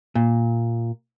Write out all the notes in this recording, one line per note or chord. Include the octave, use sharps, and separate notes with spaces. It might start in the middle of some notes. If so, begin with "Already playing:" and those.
A#2